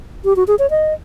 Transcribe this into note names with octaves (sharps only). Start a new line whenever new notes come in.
G4
F#4
G#4
C#5
D#5